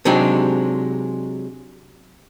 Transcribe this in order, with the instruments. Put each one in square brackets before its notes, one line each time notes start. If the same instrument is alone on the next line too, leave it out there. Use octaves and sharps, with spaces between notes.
[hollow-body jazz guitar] C3 F#3 G#3 D4 D#4 G4